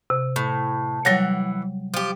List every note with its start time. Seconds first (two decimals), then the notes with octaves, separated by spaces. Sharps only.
0.10 C3
0.36 A2
1.05 E3 F#3 G3 C#5 F#5
1.94 F3 G4